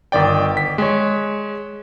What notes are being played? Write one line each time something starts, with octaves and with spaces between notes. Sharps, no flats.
G1 D#3 D5 G5
B6
G#3 C#5